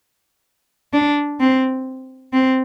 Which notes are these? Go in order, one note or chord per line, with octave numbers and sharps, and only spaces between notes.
D4
C4
C4